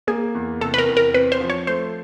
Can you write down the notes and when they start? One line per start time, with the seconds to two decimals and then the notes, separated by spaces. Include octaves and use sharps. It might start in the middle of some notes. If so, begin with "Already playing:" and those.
0.07 A#3 G#4
0.35 E2
0.60 C3 A4
0.74 B4
0.78 A#4
0.88 E2
0.97 A#4
1.14 C4 B4
1.32 C5
1.40 F3
1.50 C#5
1.67 A3 C5